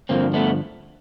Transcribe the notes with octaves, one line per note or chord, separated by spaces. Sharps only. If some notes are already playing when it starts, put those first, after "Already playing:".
G2 D3 F3 A#3 C4
A3 B3